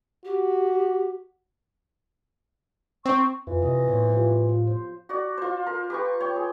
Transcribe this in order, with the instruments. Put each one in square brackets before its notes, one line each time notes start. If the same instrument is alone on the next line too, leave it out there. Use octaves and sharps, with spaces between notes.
[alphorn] F#4 [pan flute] G4
[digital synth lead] C4 [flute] C#6
[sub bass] F2 [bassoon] E3 [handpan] F4
[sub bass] C3 [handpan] C4 D#5
[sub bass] A2 [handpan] B3 C5 C#5
[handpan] F3 F4 G4
F4
C5
[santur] F#4 D5
F4 C5
A#4
G4 B4 C#6
C#5 G5
G#4